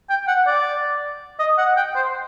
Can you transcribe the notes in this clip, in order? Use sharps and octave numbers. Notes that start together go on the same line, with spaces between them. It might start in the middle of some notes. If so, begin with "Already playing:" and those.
G5
F#5
D5
D#5
F#5
G5
C5